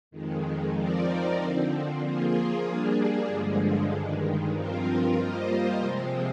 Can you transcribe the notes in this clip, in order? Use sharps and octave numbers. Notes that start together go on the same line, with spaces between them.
F2 D#3 G#3
F3 C4 D#4 A#4 D5
D3 F3 C4
F3 A#3 F4 G#4
G3 A#3 D4 G#4
G2 D3 F3 G#3
G2 D#3 G#3
G2 F3 C4 F4 A#4
G3 A#3 F4 C5 D#5
C3 F3 G#3 C4